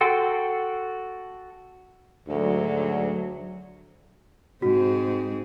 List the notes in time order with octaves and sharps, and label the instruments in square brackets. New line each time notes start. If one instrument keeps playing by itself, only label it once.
[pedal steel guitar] F#4 A4 G5 C6
[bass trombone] D2 [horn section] G#2 D3 [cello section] F#3
[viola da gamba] G#2 C4 G#4 [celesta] F#4